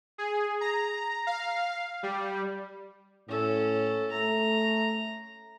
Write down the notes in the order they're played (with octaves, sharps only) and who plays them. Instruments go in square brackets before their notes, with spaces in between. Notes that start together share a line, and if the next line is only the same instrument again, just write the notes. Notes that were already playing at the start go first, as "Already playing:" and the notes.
[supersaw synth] G#4
A#5
F5
G3
[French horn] A2 [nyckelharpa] C#4 A4
[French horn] A3 [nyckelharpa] A#5